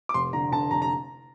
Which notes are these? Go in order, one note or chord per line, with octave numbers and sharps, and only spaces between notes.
D6
F1 C6
D3 A#5
D3 A5
F1 A#5
A#5